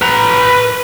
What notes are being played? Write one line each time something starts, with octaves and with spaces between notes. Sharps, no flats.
B4 A#5